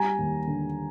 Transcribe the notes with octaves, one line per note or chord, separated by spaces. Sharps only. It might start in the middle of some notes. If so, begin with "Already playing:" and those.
Already playing: G3 G#5 A#5
D#2
D3